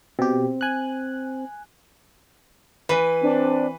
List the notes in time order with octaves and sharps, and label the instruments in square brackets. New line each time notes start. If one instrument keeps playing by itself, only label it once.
[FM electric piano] B2 G4 [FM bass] C4
[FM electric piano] G#5 F#6
[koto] E3 [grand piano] B4
[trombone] C4 [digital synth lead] D4